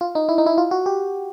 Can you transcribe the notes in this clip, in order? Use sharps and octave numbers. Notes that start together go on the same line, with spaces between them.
F4
D#4
E4
D#4
E4
F4
F#4
G4